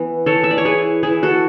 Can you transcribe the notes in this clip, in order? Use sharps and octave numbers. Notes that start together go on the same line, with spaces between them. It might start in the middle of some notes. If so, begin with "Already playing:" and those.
Already playing: E3 B3
E3 A4 C#5
E5
D5
C#5
E4 G#4 B4
E3 E4 G#4
F#4 A4